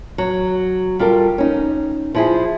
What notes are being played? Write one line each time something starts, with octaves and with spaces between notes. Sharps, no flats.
F#3
G3 F4 A4 A#4
C#4 D#4
F3 E4 G#4